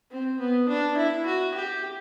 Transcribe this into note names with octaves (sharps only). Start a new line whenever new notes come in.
C4
B3
D4
E4
F#4
G4